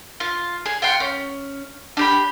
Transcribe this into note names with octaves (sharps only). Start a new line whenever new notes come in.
F4
G#4
F4 F#5 G5 C6
C#4
D4 G4 B5